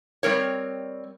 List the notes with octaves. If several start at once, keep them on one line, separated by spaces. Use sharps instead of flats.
G3 C4 A#4 C#5